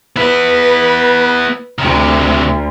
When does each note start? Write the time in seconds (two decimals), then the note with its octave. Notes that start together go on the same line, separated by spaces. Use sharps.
0.16 B3 E4 B4
1.79 D2 C3 D#3